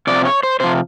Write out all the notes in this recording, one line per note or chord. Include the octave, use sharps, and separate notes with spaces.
C3 F3 D5
C#5
C5
C3 F3 C5